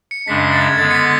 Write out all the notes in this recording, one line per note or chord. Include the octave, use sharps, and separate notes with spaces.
C#7
F#2 C#3 G#3 D4 B6
A6
G#6
D3 G#3 B3 A6
C#7
B6